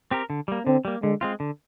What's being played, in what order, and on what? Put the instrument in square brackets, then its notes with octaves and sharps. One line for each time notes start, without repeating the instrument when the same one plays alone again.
[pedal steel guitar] C4 G4 A#4
D3
G3 A#3
[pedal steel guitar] D3 [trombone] C4
[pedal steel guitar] G3 A#3
[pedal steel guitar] D3 [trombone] G#3
[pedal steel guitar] G#3 C4 F4
D3